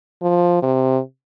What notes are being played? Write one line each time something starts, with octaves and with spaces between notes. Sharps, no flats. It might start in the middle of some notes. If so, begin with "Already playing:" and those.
F3
C3